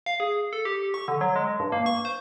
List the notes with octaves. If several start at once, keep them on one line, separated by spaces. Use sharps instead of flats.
F5
G#4
A4
G4
C#6
D3
F#3
G#3
G2
A#3
C#6
C5